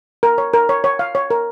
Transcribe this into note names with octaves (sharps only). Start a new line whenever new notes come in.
A#4
C#5
A#4
C#5
C#5
F5
C#5
A#4